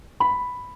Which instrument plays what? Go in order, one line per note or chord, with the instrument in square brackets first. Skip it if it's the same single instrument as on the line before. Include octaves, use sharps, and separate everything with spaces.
[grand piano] B5